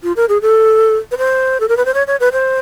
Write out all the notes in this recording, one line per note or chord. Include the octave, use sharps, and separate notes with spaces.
F4
A#4
G#4
A4
B4
C5
A4
A#4
B4
C5
C#5
C#5
B4
C5